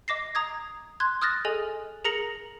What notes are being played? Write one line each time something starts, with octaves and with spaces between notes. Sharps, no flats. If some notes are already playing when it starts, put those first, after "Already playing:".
D#5 D6 A#6 C7
A#5 D#6 G#6
C6 F#6 G#6
D#6 F6 F#6 A6 A#6
G#4 A4 D#5 G#5
G#4 A#4 A#5 A#6 C#7 F#7